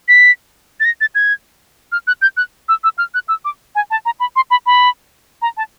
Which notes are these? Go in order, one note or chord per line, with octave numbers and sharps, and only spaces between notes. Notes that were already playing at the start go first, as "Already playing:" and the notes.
B6
A6
A#6
A6
G#6
F6
F#6
G6
F#6
E6
E6
F6
F#6
E6
D6
G#5
A5
A#5
B5
C6
B5
B5
A#5
A5